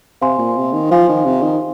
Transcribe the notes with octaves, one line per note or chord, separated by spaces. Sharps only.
C3 C5 F5 G#5 C6
A#2
C3
D#3
F3 C5 F5 G#5 C6
D#3
C3
D#3